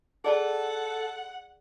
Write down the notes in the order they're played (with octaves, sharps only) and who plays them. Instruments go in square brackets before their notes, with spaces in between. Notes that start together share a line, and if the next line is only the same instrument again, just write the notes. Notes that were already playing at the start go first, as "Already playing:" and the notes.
[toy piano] G#4 D5 A5 [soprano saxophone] A4 [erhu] F#5